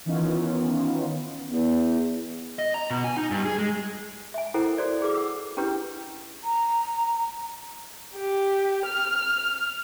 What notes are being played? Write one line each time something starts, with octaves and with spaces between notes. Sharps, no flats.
D#3 E3 B3 C#4 D#4 F4
E2
D#5
A#5
B2
G#5
D#4
G2
G#4
G#3
E5 G#5
E4 A4 A#4 C5 F#5
F#4 A4 C5 D5
G#4 B4 D6
F#5 E6
C#4 D4 E4 G4 B4
A#5
G4
F6